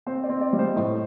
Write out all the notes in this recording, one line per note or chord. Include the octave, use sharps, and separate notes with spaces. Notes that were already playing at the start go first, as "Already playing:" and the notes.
C4 C5
D5
C4
D5
G3
C5 D#5
A2